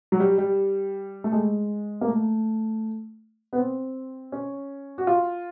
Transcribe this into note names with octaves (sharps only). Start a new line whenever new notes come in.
F#3
G3
G3
A3
G#3
A#3
A3
B3
C4
C#4
F#4
F4